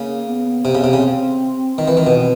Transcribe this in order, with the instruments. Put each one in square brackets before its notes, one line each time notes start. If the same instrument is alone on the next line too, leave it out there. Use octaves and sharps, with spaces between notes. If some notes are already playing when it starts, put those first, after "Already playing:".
Already playing: [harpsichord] C#3 [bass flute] A#3
[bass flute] B3
[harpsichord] C3 [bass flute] C4
[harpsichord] C#3
[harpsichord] C3 [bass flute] B3
[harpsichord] C#3 [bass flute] C4
[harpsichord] D#3 [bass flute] C4
[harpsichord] E3
D#3
B2